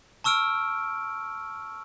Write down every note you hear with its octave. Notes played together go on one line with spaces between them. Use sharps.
A5 C#6 E6 F6 D7